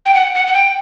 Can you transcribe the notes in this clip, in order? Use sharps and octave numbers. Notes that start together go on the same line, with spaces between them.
G5
F#5
F#5
F#5
G5